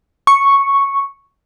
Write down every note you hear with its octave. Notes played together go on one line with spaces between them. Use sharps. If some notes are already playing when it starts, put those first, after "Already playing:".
C#6